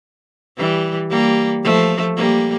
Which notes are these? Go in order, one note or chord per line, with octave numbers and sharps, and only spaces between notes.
E3 G3
G3 A#3
F3 A3
G3 A#3